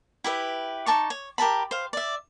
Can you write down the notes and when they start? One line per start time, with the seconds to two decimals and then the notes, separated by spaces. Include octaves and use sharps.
0.24 E4 G4 B4 E5
0.86 D#4 A5 C#6 D6
1.10 C#5
1.38 G4 A#4 A5 B5
1.71 C5 F5
1.93 D5 E5